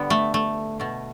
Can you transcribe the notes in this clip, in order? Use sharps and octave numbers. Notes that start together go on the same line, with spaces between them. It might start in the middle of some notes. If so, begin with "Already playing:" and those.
Already playing: D3 G3 B3
A3
A3
B2 A3